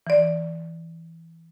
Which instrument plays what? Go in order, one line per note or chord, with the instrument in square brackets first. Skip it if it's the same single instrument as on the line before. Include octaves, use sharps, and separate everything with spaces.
[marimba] E3 D5